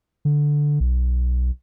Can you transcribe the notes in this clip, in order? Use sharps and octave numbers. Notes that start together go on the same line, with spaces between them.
D3
B1